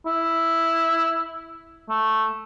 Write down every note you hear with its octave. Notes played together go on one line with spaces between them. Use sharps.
E4
A3